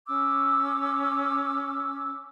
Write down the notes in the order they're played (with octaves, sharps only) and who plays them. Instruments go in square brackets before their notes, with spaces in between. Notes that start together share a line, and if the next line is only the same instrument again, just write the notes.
[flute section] C#4 D6 E6